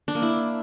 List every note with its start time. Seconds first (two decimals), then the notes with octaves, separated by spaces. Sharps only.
0.08 D4
0.15 A#3
0.22 E4